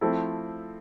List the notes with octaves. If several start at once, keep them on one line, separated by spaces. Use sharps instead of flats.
F3 A3 C4 E4 A4